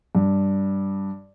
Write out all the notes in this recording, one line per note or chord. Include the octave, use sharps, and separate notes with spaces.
G2